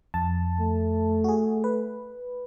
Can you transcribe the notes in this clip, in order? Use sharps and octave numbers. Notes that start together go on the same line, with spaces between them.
F2 A5
A3
F#4 G#4
B4